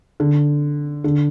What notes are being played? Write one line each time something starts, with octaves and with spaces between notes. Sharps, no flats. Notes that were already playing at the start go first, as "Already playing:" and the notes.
D3
D3